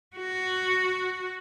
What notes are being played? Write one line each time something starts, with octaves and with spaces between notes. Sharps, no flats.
F#4